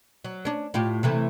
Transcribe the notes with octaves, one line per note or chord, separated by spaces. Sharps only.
F#3
C#4 D4
A2 F4 G4
C3 E3 A3